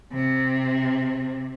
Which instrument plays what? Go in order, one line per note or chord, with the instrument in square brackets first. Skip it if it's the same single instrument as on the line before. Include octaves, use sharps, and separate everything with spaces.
[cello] C3